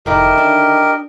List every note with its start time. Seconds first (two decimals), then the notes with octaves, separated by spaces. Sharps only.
0.06 F1 D3 D#3 E4 G4 A#4 D#5
0.38 D4